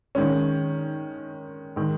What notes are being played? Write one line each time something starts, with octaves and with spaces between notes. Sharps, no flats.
D#3 G#3 C#4
D#3 G#3